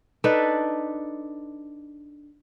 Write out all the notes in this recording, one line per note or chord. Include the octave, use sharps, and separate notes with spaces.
D4 D#4 A4 B4